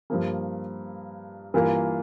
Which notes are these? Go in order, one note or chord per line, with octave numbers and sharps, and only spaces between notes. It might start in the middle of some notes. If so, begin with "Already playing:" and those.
G2 F3 A#3
G2 E3 A#3 F4 A#4